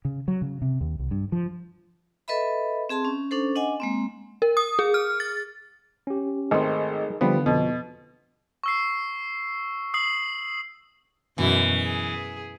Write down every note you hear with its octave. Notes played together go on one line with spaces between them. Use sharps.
C#3
F#3
C#3
C3
D#2
C2
G2
F3
A4 B4 D#5 E5 B5
C4 G#4 A5 C6
C#4
C#4 D4 A4 C5
D4 D#5 F#5 G#5
G#3 A#3 C4
A#4
D#6
G#4
F6
A6
C#4 G4
G#1 G#3 A3 C4 G#4 A#4 D#5
D3 F3 G3 B3
F2 B2
C#6 E6 C7
D#6 C7 F#7
F#2 B2 E3
G#4